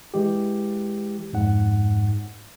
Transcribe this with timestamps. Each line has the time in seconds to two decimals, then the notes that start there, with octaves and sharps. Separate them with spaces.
0.14 E3 G#3 G4
1.33 F2 G#2 F#5